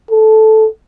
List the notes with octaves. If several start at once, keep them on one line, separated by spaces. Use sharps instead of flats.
A4